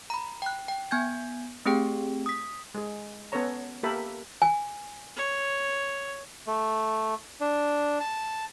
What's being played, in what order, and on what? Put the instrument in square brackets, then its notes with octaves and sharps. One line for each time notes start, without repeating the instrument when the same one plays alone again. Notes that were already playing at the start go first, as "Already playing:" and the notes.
[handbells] A#5 B5
G5 F#6
G5
B3 G#5 G6 G#6
A3 C4 G4 G#4 G5
D#6 B6
[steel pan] G#3 G#4
B3 C#4 A4 B4 C#5 A#5
A#3 G4 A4 A#4 E5 B5
[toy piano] G#5
[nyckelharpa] C#5
[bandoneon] A3
D4
A5